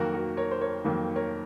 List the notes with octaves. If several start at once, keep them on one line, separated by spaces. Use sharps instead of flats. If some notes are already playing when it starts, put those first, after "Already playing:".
Already playing: F2 D#3 F#3 A#3 F#4 A#4
F#4 A#4
A#4 C#5
C5
A#4 C#5
F2 D#3 F#3 A#3
A#4 C#5